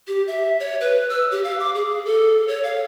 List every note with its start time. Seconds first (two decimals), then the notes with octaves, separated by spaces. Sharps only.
0.08 G4
0.27 E5
0.60 C#5
0.81 B4
1.10 E6
1.31 G4
1.44 F5
1.60 D6
1.75 G#4
2.05 A4
2.48 C#5
2.63 F5